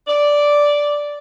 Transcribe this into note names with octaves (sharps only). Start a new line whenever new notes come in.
D5